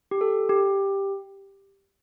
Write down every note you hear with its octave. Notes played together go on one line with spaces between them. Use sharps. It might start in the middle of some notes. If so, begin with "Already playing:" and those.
G4
A4
G4